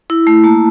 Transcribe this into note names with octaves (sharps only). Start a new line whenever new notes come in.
E4
A3
A#3 A5